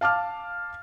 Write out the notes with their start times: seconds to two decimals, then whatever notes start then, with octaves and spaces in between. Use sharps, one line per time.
0.01 F5 A5 D6 F6